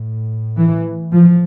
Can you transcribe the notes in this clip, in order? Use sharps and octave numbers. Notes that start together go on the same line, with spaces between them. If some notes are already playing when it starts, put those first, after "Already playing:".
Already playing: A2
E3
F3